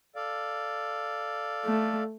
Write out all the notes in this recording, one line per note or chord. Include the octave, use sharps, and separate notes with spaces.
A4 D5 F5
A3